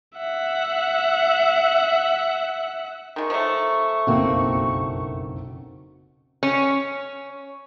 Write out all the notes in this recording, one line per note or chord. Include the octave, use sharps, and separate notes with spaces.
E5 F#5
D#3 G#3 C#6
F3 F#3 A3
F#1 B1 F2 A#3 C4 F#4
C#4